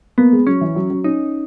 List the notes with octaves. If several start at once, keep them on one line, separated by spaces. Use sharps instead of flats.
A#3 B3
G#3
F#3 C#4
E3
F#3
F#3
C#4 D#4